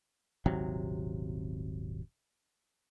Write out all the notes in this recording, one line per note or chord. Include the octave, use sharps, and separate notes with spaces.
D#1 G#1 C3 F#3